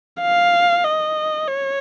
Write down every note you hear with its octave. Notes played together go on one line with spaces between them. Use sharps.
F5
D#5
C#5